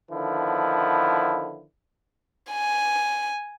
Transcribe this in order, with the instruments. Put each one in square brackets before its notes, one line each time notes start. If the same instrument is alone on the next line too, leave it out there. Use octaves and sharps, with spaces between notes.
[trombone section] D3 D#3 F3 B3 E4
[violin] G#5